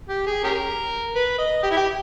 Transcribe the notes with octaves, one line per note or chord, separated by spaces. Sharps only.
G4
G#4
C#4 G4 A#4
B4
D#5
G4
E4
G4